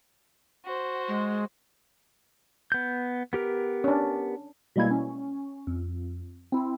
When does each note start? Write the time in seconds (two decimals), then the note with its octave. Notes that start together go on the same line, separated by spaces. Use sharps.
0.66 F#4 C5
1.08 G#3
2.72 B3 G6
3.33 B3 G4 A#4
3.84 C#4 D4
4.76 B2 G3 G#3 A#3 E4 G#6
4.91 C#4
5.67 F2
6.52 C4 E4